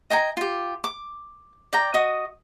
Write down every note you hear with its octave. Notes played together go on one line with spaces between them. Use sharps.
D#5 G5 G#5 A#5
F4 G4
D6
D5 G5 A#5
F#4 D#5 D#6